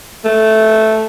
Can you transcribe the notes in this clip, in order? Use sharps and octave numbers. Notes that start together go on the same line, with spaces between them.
A3